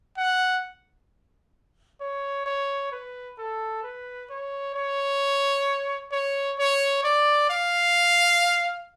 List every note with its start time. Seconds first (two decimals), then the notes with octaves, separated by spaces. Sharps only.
0.17 F#5
2.01 C#5
2.46 C#5
2.92 B4
3.38 A4
3.83 B4
4.30 C#5
4.75 C#5
6.12 C#5
6.59 C#5
7.04 D5
7.50 F5